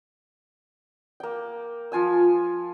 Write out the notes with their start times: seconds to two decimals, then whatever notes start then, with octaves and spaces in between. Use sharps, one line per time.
1.20 A#3 G5
1.92 F3 F4 G#5 E6